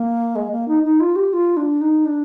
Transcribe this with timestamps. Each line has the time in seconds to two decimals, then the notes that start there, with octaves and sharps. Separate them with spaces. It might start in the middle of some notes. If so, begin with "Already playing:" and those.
Already playing: A#3
0.35 G#3
0.51 A#3
0.68 D#4
0.84 D#4
1.00 F4
1.16 G4
1.33 F4
1.57 D4
1.81 D#4
2.05 D4